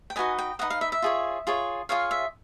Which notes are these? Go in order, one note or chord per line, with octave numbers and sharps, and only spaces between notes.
G5
D#4 F#4 B4 D#5 G#5
G5
D#4 F#4 B4 D#5 F#5
F5
E5
E5
F4 G#4 C#5
F4 G#4 C#5
F4 G#4 C#5 F5
E5